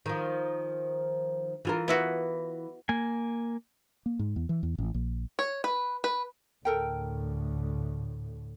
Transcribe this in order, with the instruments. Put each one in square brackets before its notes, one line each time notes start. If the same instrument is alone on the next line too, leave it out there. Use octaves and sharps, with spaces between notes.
[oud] D#3 F3
E3 F4 A#4
[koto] B3 E4 F#4
[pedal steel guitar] A#3 G#5
[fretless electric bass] A#3
G#2
E2
E3
E2
A1
A#1
[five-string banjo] C#5
B4
B4
[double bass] D2 A2 [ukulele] A4 A#4 G5